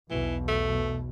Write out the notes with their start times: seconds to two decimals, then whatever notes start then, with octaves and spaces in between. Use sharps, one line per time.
0.10 B1 E2 B2 E3
0.48 A3